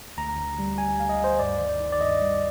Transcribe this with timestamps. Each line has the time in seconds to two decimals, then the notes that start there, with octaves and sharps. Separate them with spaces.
0.17 D2 A#5
0.37 D3
0.59 G3
0.78 G3 G#5
0.99 D2 F5
1.09 D#5
1.20 D2 C5
1.39 G2 D5
1.60 D#3
1.80 D#3
1.92 D5
2.00 G2 D#5
2.22 G3